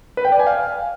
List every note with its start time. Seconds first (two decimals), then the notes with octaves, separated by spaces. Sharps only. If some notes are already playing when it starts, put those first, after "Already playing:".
0.17 B4
0.25 G5
0.32 D5
0.39 G#5
0.47 F5